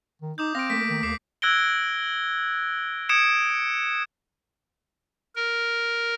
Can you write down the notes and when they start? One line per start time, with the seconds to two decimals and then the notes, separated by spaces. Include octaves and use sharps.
0.22 D#3
0.38 D#4 D6 D#6 G6
0.55 C4 F5 A#6 D7
0.70 A3 A#3 B6 D7
0.90 D#3
1.03 D#2 D6 C7
1.42 E6 F#6 G#6 A#6 D7 G7
3.09 D#6 G#6 C#7 D7 E7
5.35 A#4